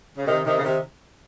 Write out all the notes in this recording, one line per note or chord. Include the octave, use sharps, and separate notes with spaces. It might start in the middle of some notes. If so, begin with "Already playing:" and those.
C#3
C3 D#3
C3 D#3
C#3
C3 D#3